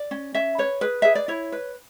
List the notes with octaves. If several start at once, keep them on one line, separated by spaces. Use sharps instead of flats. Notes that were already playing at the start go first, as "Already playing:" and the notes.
Already playing: D5
C#4
C#4 E5
B4 C#5
G#4 B4
G#4 E5
D5
E4 C#5
B4